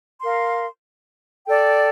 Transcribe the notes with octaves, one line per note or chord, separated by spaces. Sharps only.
A#4 F5 C6
A4 D5 G5